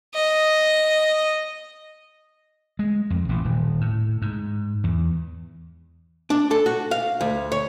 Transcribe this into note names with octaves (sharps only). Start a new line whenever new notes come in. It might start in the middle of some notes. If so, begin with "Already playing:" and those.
D#5
G#3
F2
A1
D#1
A2
G#2
E2
D4
A4
F#4
F5
D2
C#5